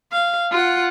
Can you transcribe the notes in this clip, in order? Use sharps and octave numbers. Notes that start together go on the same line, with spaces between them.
F5
F4 F#5